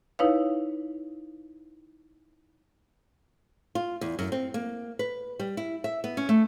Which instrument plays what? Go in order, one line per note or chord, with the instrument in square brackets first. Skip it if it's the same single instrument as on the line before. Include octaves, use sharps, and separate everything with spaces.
[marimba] D#4 E4 B4 C#5 F5
[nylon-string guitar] F4
E2
F#2
C4
A#3
B4
G3
E4
E5
B3
C#4
A3